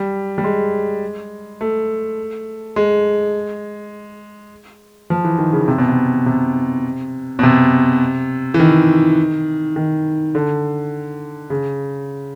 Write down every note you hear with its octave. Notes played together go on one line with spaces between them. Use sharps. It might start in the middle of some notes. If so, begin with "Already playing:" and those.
Already playing: G3
G3
G#3
A3
G#3
F3
E3
D#3
C#3
C3
B2
C3
C3
B2
C3
E3
D#3
D#3
D3
C#3